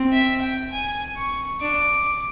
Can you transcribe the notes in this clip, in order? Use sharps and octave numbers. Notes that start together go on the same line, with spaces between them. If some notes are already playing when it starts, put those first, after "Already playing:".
Already playing: C4
E5
G5
G#5
C#6
D4 D6